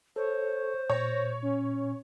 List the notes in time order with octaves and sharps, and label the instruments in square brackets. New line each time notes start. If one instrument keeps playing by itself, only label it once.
[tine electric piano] A4 [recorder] C5 [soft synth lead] C#5
[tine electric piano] A#2 [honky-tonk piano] C#5 [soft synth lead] A#6
[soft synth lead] C#4